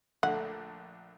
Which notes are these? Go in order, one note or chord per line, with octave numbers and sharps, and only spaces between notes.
A#1 D3 A3 F#5